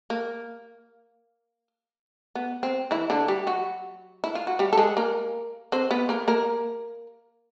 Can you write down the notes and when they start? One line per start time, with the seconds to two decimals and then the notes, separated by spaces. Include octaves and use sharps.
0.10 A#3
2.35 B3
2.63 C4
2.91 E3 E4
3.10 D3 D4
3.28 G3 G4
3.47 F#3 F#4
4.24 E4
4.35 F4
4.47 F#4
4.59 G3 G4
4.73 A4
4.77 G#3 G#4
4.97 A#3 A#4
5.72 C4 C5
5.91 B3 B4
6.09 A#3 A#4
6.28 A#3 A#4